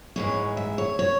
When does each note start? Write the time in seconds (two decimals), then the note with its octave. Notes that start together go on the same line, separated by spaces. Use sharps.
0.16 G#2 E3 G#3 C#5
0.57 E5
0.78 C#5
0.99 C#5